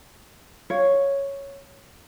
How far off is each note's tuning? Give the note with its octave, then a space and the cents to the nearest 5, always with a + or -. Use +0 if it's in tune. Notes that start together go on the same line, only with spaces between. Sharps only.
C#5 +0 F5 +0